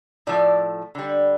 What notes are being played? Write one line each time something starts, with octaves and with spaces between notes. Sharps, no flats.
A2 F3 A3 D5
D3 G3